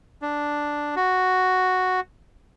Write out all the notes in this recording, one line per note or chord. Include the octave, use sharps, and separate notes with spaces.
D4
F#4